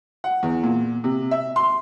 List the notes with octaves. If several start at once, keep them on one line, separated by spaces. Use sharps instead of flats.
F#5
E2
A#2
C3
E5
C6